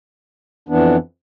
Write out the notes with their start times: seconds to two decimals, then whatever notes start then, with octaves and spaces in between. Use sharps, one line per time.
0.68 F2 E3 B3 D4